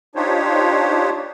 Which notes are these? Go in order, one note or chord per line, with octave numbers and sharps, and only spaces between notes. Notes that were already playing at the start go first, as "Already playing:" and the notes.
D4 D#4 F4 G4 C5 C#5